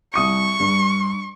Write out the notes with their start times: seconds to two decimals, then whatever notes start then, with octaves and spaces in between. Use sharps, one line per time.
0.14 C2 C#6 D#6 C#7
0.60 G2